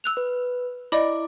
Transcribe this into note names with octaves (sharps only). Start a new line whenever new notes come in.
E6 F#6 F7
B4
E4 D5 D#5 B5 D6